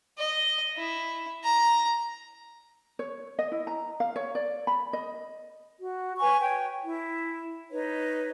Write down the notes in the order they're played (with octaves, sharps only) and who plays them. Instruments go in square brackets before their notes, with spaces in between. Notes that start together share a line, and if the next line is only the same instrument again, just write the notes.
[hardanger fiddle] D#5
E4
A#5
[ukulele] C#5
D#5
E4
A#5
F5
C#5
D5
B5
D#5
[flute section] F#4
B4 C#5 G#5 C#6
C#5 G5
E4
D#4 B4 C#5